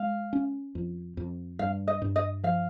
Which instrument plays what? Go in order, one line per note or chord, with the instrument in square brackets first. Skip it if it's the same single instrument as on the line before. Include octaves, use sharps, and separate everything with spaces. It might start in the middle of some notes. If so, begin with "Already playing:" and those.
Already playing: [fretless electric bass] G#3 [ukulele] F5
[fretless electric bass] C#4
F2
F2
[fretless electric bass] G2 [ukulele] F5
[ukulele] D#5
[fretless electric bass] G2
[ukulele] D#5
[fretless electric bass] F3 [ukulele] F5